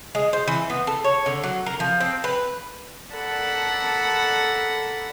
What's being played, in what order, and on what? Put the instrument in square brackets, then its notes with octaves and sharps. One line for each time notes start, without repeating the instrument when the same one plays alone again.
[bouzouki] G#3
C5
E3
B3
A4
C#5
D3
F#3
A#4
F3
C4
B4
[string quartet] A4 A#4 D5 F#5 A5 B5